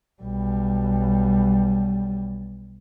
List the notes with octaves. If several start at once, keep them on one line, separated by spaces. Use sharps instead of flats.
B1 G3